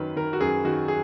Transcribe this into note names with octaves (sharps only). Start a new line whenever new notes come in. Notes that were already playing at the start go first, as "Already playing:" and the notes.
Already playing: F#2 D#3 F#3 B4
D#3 A#4
F#4
F#2 G#4
D#3 F#4
G#4